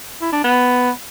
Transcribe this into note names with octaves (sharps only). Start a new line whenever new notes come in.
E4
D4
B3